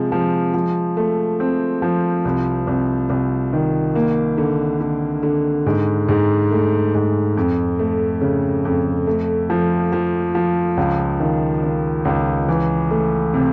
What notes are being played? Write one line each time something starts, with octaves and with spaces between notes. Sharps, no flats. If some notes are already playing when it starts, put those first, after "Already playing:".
Already playing: C3 F3 G#3
F3
F3
A3
C4
F3
C2
C2
C2
D#3
A#3
D3
D3
D3
G#2
G#2
A3
G#2
F2
A3
C#3
F2
A3
F3
F3
F3
C#2
D#3
D#3
C#2
E3
A3
C3